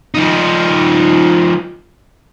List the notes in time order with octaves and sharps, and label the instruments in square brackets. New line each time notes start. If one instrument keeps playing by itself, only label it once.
[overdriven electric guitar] F3 D#4